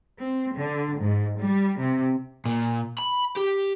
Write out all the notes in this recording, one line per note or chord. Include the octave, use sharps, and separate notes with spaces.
C4
D3
G#2
G3
C3
A#2
B5
G4